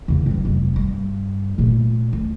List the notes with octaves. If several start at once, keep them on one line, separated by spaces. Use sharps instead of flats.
E2 C#3
G2 F#3
F1
G2
A#2 A3
D2